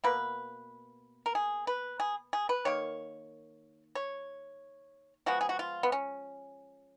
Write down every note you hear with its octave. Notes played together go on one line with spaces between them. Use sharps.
B2 A#3 B4
A#4
G#4
B4
G#4
G#4
B4
D#3 A#3 C#5
C#5
F3 G#3 B3 F#4
G#4
F#4
F4
B3
C#4